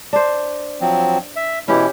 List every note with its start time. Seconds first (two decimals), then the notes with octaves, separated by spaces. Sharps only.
0.13 D4 C5
0.81 F3 F#3 C4
1.36 E5
1.68 B2 E3 C#4 E4 G4